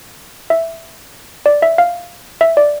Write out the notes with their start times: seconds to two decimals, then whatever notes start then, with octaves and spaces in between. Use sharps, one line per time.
0.50 E5
1.46 D5
1.62 E5
1.78 F5
2.41 E5
2.57 D5